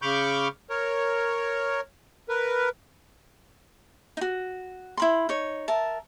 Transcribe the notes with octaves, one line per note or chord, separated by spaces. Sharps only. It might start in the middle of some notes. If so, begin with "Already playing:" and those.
C#3 B5 C#6 D6 F6 G6
A#4 C#5
A#4 B4
D#4 F#4
E4 B5 C6
D#4 C#5
A#4 E5 A5